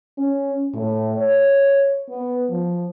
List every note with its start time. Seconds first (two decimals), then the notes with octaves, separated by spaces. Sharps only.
0.18 C#4
0.74 A2
1.16 C#5
2.09 B3
2.50 F3